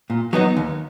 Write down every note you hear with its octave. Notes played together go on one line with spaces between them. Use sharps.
A#2
F#3 B3 D#4
D#2